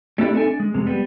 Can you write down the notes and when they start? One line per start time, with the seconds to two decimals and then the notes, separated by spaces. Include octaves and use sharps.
0.18 G3 A3 D4 E4 G4 D5
0.33 C4 D#4 A4 D5 E5 G#5
0.47 D4
0.60 G#3
0.74 C2 F2 C3 G#3
0.87 G3 B3